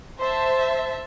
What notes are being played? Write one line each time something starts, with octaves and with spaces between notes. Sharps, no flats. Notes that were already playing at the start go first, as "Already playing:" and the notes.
C5 E5 A5